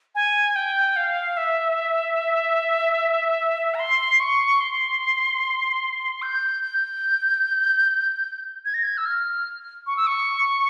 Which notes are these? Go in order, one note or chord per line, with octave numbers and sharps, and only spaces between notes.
G#5
G5
F5
E5
A#5
C6
C#6
C6
G6
G6
G#6
A#6
G#6
E6
F6
C#6
E6
C#6